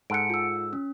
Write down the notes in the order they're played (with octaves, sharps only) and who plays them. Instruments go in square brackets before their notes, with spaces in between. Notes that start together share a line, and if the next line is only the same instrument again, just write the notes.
[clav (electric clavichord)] G#2 A4 F#5 [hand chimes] C#7 D7
[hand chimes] F4 E6
C#4